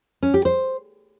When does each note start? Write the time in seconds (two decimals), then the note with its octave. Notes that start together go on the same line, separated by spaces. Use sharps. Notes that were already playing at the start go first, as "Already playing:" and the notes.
0.23 C#4
0.34 G4
0.45 C5